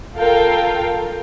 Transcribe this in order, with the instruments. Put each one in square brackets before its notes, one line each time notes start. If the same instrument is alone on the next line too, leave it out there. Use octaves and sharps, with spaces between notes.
[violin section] F4 A4 A#4 F5 G5